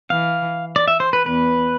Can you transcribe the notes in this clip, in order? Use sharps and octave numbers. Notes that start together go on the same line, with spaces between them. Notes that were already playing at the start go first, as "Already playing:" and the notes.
E3 F5
D5
E5
C5
B4
E2 B4